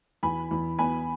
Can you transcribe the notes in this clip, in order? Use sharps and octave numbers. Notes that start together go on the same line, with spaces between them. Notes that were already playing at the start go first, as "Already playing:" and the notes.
E2 G#5 B5
E2
B3 G#5 B5